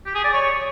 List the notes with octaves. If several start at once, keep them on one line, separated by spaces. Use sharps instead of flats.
G4
G#4
D5
C#5